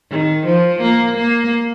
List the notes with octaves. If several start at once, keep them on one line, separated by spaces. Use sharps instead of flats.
D#3
F3
A#3
A#3